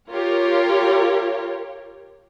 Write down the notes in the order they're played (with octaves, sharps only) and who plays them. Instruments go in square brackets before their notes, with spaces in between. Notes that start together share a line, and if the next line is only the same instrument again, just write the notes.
[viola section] F4 G4 A#4 C#5